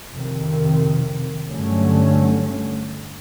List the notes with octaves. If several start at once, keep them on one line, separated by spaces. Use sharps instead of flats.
F2 C3 D#3
G2 D3 F#3 A3 C#4